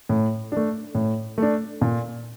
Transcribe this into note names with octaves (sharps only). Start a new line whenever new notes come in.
A2
A3 D4
A2
A3 D4
A#2